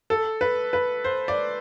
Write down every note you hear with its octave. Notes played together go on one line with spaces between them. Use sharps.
A4
B4
B4
C5
D5